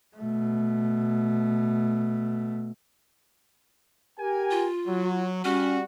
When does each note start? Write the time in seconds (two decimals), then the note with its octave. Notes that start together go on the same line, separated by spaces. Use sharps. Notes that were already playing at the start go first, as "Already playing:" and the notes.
0.17 B2 A3
4.19 G4 A#4 G#5
4.51 F4
4.88 F#3
5.44 G3 C#4 F#4